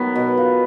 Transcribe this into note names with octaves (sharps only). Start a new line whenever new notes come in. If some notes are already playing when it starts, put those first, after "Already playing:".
Already playing: D#3 F#3 B3
B2
F4